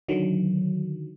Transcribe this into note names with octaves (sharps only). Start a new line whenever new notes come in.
D3 D#3 F#3